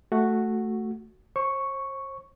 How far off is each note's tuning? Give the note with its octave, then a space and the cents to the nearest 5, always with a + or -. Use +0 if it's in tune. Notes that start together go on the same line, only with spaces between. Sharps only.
A3 +0 F#4 +0
C5 +40 C#6 +0